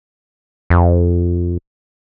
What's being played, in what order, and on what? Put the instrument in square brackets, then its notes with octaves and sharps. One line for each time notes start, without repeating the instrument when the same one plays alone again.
[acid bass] F2